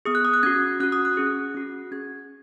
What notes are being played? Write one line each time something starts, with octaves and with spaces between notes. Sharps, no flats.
B3 G#4 D#6
F#6
D#6
F#6
C#4 F#4 G#6
C#4 F#4 F#6
D#6
F#6
C#4 G#4
C#4 F#4
C#4 G#4 G#6